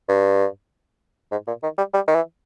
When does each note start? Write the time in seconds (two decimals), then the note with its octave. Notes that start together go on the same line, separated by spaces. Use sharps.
0.09 G2
1.32 G#2
1.47 A#2
1.63 D#3
1.78 G3
1.94 G3
2.08 D#3
2.15 E3